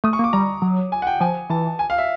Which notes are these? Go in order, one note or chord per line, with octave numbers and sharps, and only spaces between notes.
A3 D#6
C#6
A#3
D6
G3 A#5
F#3
G#5
F#5
G5
F3 G#5
E3 A5
G#5
F5
E5